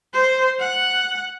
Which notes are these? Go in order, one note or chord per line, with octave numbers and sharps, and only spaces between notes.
C5
F#5